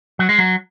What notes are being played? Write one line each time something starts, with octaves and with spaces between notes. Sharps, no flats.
F#3
G#3
F#3